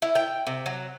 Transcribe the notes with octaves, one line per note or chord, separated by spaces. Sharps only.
E4
G5
C3
F#3